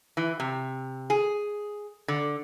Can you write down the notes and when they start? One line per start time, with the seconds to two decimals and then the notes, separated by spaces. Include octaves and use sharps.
0.17 E3
0.40 C3
1.10 G#4
2.08 D3